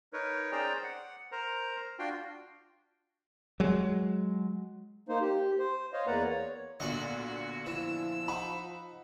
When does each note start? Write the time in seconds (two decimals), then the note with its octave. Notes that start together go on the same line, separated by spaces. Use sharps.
0.13 D#4 A#4 B4 C#5
0.52 C#4 G#4 C5 D5 G5 A#5
0.84 F#5
1.32 A#4 C5 A#5
1.99 D4 F4 F#4 G5 C6
3.60 F#3 G#3
5.09 A#3 D#4 C5
5.21 G4
5.58 C5
5.93 C5 C#5 D#5 F5
6.07 E2 A#3 B4 D5 F#5 A#5
6.29 C#5
6.80 B1 A#2 D3 F#4 D#5 C#6
7.66 E3 F3 E6
8.28 D#4 F#5 B5